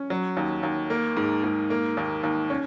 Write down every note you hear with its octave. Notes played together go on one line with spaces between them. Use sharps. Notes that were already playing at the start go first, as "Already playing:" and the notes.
Already playing: C#4
F#3
D#2
D#2
A#3
G#2
G#2
A#3
D#2
D#2
C#4